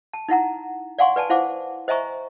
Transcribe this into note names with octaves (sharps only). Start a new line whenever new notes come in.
A5
D#4 E4 F#5 A#5
D5 F5 F#5 G#5 C6 C#6
B4 D5 G#5 A5
E4 C5 F5 F#5 D6
C5 D#5 E5 G#5 A#5 C#6